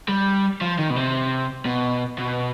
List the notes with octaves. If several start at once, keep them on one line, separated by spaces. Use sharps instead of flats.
G3
F3
D#3
B2
C3
B2
B2